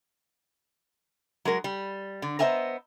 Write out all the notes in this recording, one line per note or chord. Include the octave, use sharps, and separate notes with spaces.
F#3 G#3 A#4
G3
D3
B3 C5 D#5 E5 G#5 A#5